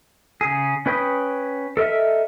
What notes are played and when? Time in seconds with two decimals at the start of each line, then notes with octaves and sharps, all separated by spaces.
0.41 C#3 G#4
0.86 C#4 B4 G5 B5 D#6
1.77 A4 A#4 D#5 E5